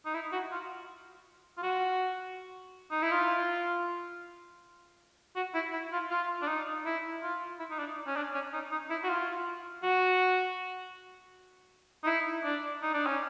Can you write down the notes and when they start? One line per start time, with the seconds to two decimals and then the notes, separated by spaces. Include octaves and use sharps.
0.05 D#4
0.14 E4
0.32 F#4
0.52 F4
1.57 F4
1.63 F#4
2.91 D#4
3.02 E4
3.12 F4
5.36 F#4
5.55 E4
5.73 E4
5.92 F4
6.11 F4
6.42 D4
6.48 D#4
6.85 E4
7.23 F4
7.59 E4
7.70 D#4
7.79 D4
8.07 C#4
8.16 D4
8.34 C#4
8.53 D#4
8.71 D#4
8.90 E4
9.04 F#4
9.09 F4
9.83 F#4
12.04 D#4
12.07 E4
12.44 D4
12.82 D#4
12.94 D4
13.06 C#4